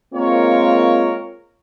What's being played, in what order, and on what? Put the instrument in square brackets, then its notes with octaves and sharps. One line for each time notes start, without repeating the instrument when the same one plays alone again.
[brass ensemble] G#3 A#3 C4 F4 A#4 C#5